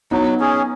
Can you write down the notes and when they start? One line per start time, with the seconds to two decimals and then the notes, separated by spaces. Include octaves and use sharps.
0.11 F#3 B3 D#4
0.40 C#4 G#4